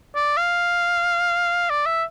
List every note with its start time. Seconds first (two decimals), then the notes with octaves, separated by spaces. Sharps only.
0.16 D5
0.37 F5
1.70 D5
1.86 E5